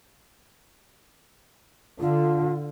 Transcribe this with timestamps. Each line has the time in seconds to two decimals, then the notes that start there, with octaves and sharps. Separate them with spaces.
2.00 D3 F4